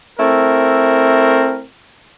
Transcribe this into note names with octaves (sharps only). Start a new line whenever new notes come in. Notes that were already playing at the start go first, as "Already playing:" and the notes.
A3 C4 E4 A#4